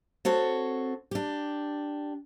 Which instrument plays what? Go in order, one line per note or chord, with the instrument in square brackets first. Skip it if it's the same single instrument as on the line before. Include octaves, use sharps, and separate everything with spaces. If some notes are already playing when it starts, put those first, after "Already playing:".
[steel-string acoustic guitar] C4 F#4 A4 C#5
D4 G4